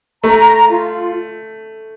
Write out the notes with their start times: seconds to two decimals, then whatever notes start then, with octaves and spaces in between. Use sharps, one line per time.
0.24 A3 A#5
0.70 F4